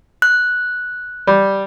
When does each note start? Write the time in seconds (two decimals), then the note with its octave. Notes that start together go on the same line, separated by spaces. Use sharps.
0.22 F#6
1.27 G3